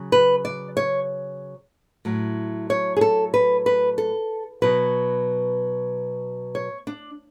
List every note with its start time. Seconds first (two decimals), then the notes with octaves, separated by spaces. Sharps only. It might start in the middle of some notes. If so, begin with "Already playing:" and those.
Already playing: C#3 F#3
0.12 B4
0.45 D5
0.77 C#5
2.05 A2 F#3
2.70 C#5
2.96 G#4
3.01 A4
3.34 B4
3.66 B4
3.98 A4
4.62 B2 F#3 B4
6.55 C#5
6.87 D4